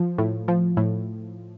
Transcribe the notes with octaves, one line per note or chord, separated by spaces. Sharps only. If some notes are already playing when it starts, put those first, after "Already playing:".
Already playing: F3
A2
F3
A2